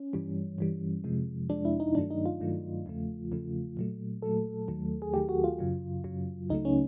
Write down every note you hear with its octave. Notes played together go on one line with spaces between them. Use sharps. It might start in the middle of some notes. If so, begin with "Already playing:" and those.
Already playing: C#4
G2 E3 G3
G2 E3 G3
F2 C3 F3 G#3
F2 C3 F3 G#3 D4
E4
D#4
G2 D#3 F#3 A3 D4
D#4
F4
G2 D#3 F#3 A3
E2 C#3 F3 A3
E2 C#3 F3 A3
A#2 F#3 A3
A#2 F#3 A3 A4
D#2 D#3 F#3 A3
G#4
D#2 D#3 F#3 A3 G4
F#4
F4
F#2 C#3 F#3
F#2 C#3 F#3
C#2 C#3 F#3 A3 D#4
C#4